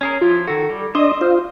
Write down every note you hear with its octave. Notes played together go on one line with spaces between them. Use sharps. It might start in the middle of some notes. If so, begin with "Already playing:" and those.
C#4 G#4 A#4 C#5
F3 E4 F4
D#3 F#4 A4
G3
D4 D#5 E5 C6 D#6
F4 C5